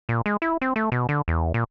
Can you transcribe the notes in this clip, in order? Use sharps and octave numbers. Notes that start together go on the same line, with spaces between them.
A#2
G#3
E4
C4
A3
B2
D3
E2
A#2